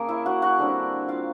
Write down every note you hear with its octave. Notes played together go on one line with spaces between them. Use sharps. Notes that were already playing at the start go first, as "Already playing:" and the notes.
Already playing: C#3 A#3 C#4 G#4 A#4
E4 E5
F#4 F#5
F#4 F#5
D3 G3 C4
F4 F5